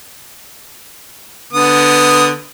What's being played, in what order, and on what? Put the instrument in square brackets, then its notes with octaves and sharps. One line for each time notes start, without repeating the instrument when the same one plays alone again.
[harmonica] D3 B3 D#6